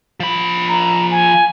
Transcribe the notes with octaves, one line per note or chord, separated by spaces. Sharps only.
F3 B5
A#5
G#5